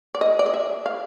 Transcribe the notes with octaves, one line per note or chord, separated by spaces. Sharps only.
D5
D#5
D5
D#5
E5
F5